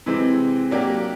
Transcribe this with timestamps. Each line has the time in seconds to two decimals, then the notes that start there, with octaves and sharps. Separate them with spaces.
0.06 C3 E3 G#3 C4
0.71 F#3 A#3 D4 G4